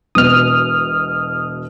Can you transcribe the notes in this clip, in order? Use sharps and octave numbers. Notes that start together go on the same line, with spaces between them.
E1 B2 D#6 F6